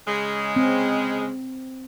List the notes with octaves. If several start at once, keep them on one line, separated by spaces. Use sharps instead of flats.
C#3 G#3
C4